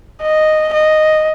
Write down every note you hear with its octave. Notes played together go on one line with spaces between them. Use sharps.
D#5
D#5